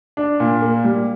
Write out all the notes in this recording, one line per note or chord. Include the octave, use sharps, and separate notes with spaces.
D4
A#2
A#3
G3